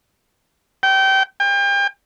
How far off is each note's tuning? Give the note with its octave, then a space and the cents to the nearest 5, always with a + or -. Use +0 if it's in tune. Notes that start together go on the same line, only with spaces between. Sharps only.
G5 -25
G5 +35